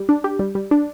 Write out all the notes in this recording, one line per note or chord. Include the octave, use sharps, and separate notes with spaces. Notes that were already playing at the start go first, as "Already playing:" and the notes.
Already playing: G3
D4
G4
G3
G3
D4